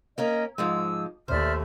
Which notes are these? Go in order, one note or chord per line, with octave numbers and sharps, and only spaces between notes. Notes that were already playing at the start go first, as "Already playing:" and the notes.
A#3 C#4 A#4 D#5
G#2 F3 G#3 E6
D#2 A3 C5 D5 E5 F6